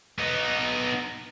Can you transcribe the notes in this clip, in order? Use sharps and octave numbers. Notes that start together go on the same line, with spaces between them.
B3 D#4